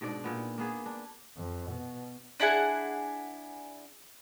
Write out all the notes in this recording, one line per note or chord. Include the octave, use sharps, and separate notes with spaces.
G#2 B2 D4 D5
A#2 B3
A#3 B3 G#4
D4
F2
B2
D4 E4 G#4 F#5